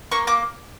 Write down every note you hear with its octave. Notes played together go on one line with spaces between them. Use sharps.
A#3 C#6
A#3 D6